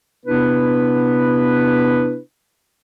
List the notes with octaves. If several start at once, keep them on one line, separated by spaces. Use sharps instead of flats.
C3 B3 D4 E4 B4